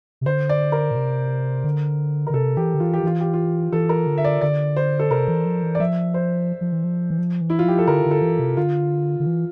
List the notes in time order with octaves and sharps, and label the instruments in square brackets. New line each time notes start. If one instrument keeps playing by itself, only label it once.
[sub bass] C3
[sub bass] D3 [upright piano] C5
[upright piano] D5
A#4
[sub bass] A#2
C3
D3
[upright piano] A#4
[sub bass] D3
[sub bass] C3 [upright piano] A4
[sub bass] E3 [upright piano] G4
[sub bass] D3
[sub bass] E3 [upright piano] F4
[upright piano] G4
[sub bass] E3 [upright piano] F4
[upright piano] G4
F4
[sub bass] E3 [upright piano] A4
[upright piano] A#4
[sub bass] D3
[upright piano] E5
D5
[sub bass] D3 [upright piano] D5
[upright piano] C5
A4
[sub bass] C3 [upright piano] A#4
[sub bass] E3
F3
E3
[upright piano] D5
[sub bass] F3 [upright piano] E5
[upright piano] C5
[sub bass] F3
E3
F3
E3
F3
E3
[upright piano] E4
F4
[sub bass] F3 [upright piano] G4
[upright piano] A4
[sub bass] D3 [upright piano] A#4
[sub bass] D3
[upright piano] A4
[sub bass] E3
C3
[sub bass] D3 [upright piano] F4
[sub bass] D3
E3